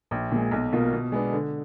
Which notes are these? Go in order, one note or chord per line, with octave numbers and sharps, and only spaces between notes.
A#1
A#2 G#3
B1
B2 A#3 F4
B2
G#3 B3 D4
D3